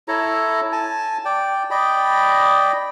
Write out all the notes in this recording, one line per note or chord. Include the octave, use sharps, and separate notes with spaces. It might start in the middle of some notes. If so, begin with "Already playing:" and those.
E4 A4 C#5 A#5
G#5 A5
D5 G5
D5 D#5 G5 B5